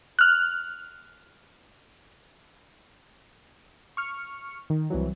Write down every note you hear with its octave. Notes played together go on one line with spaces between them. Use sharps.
F6 F#6
C#6 F6 C#7
D#3
C2 E3 F#3